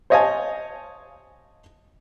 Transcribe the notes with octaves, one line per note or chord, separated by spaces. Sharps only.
C5 C#5 D#5 F5 G#5 A5